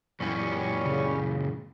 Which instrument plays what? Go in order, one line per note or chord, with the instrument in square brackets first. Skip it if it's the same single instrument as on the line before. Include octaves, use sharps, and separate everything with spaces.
[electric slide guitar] F#2 A#2 E3 [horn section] G3 C#4
[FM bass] C#3